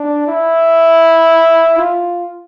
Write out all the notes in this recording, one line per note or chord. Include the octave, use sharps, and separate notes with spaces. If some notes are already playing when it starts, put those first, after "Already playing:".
Already playing: D4
E4
F4